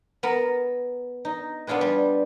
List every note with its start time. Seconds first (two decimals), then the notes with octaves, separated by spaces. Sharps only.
0.23 B3 A#4
1.25 D#4
1.67 B3 D4 F4 G#4 B4
1.81 G3